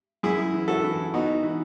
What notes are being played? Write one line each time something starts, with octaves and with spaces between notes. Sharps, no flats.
F#2 E4 G#4
E3
F#4 A4
E3
B3 D#4 F#4
E3